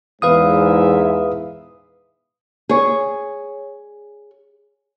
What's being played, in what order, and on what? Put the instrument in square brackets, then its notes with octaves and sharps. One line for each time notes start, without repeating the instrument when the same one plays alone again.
[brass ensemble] E2 G#2 E5 [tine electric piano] B4 F5 D#6
[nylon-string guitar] G#4 C#5